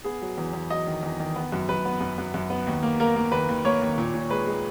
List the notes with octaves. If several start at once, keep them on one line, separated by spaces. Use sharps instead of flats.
B3 G#4
F#3
E2
E2
F#3 D#5
D#3
E2
D#3
B3
F#2
F#2 B4
B3
F#2
F#2
F#2
B3
D#2
A#3
A#3 A#4
A#3
D#2 B4
D#2
A#3 C#5
D#2
A#2
A#2
G#3 B4
G#3